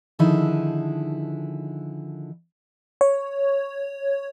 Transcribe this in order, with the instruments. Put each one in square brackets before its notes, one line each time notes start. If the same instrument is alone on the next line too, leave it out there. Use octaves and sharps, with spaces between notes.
[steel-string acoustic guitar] D3 D#3 F3 D#4 E4 G#4
[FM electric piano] C#5